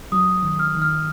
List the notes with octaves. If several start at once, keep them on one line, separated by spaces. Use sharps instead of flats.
F#3 D#6
D#3
F6
D#3
F6